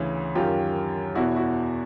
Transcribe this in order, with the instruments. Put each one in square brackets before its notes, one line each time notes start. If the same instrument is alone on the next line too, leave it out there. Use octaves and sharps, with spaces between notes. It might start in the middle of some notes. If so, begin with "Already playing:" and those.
Already playing: [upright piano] D2 C#3 E3
F#2 D#3 F4 G4
E2 B2 E4 F#4
E4 F#4